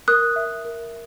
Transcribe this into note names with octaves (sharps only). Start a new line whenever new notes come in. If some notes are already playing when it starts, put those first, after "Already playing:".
A#4 D#6 F#6
E5
A#4